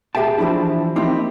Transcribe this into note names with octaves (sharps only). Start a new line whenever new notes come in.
G4 G#4 E5 G5 A5
E3 F3 G#3 D4 E4
A#3 C4 D#4 E4 G4